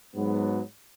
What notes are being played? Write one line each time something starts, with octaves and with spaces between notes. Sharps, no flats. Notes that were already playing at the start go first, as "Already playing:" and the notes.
G#2 F#3 B3